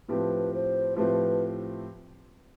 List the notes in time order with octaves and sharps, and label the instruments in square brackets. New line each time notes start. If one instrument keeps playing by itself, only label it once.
[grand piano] A2 F3 A3 C4 G4 [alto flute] B4
[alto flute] C5
[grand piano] A2 F3 A3 C4 G4 [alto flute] B4